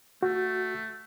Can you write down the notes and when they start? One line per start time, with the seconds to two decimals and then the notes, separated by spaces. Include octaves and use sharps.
0.23 A3 F#4